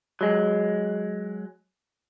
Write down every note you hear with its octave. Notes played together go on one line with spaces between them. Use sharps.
F#3 G#3